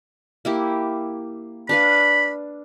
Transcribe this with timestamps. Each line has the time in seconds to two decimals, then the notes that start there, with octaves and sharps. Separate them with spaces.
0.45 A#3 E4 G4
1.69 D4 B4 F5 B5